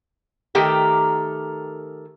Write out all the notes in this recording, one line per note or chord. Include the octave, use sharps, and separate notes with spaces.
D#3 A3 G4 A#4